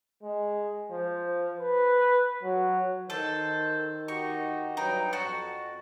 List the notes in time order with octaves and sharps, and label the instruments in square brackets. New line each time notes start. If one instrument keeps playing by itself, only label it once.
[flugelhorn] G#3
F3
B4
F#3
[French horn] D#3 [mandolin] A4 [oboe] C5
[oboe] D#4 [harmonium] F#4 G4 D#5 [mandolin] C#6
[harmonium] G2 F#3 B4 [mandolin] D#4 [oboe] G5
[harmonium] F2 [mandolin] F#4 [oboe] A5